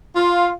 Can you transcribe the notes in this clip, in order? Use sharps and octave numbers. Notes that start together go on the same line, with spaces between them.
F4